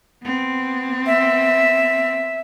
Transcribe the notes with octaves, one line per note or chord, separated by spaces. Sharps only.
B3 C4
E5